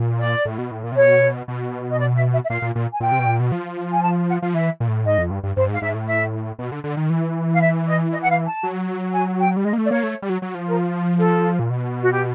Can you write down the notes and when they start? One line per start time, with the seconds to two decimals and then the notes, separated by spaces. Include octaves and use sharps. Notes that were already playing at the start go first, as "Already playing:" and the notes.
Already playing: A#2
0.19 D5
0.45 A2
0.58 B2
0.71 A2
0.84 A#2
0.92 C3
0.96 B2 C#5
1.48 B2
1.90 D#5
1.98 D5
2.16 E5
2.32 E5
2.44 E5
2.49 A#2 F5
2.62 A#2
2.75 A#2
2.93 G#5
3.00 A#2 G5
3.12 C3
3.19 B2
3.26 A#2
3.40 B2
3.52 F3
3.91 G#5
4.02 A5
4.29 F#5
4.42 F3 F5
4.54 E3 E5
4.80 A#2
4.88 A2
5.06 G#2 D#5
5.18 F2
5.31 G2
5.43 G2
5.56 G2 C5
5.69 G#2
5.74 F5
5.82 G#2 E5
5.95 A2
6.07 E5
6.59 B2
6.72 D3
6.84 D3
6.97 D#3
7.10 E3
7.54 F5
7.61 E5
7.86 D#5
8.12 D#5
8.22 F#5
8.29 F5
8.47 A5
8.63 F#3
9.14 G#5
9.40 G5
9.57 G3
9.65 G#3 D#5
9.73 A#3
9.78 A3
9.84 D5
9.91 A#3 C#5
10.03 A3
10.22 G3
10.29 F#3
10.42 F#3
10.55 F3
10.68 A#4
11.18 A4
11.59 A#2
11.70 B2
12.03 F#4
12.11 G4